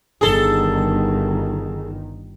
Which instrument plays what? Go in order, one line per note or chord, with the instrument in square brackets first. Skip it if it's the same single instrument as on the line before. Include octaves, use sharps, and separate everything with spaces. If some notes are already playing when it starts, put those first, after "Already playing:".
[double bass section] G1 D#3 [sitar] G#4 A4